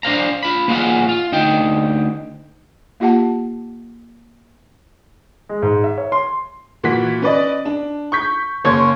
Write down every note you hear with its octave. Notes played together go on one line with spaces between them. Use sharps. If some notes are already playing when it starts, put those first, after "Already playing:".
D4 C5 F5 A#5
F4 B5
A#3 F4 F#4 G#4 F5 F#5
F4
D2 D#4 G5
A#3 F4 G4 F#5 A5
G#3
G#2
E5
C#5
C6
A#2 E3 E4 F#4 B6
C#4 B4 D5 D#5
D4
C#6 G6 B6
F#1 A#3 C#5 C6 C#6 G#6